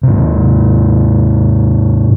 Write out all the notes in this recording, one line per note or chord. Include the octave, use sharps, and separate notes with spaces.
G#2 C3